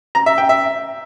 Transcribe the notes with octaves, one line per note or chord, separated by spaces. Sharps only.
A#5
E5
G5
E5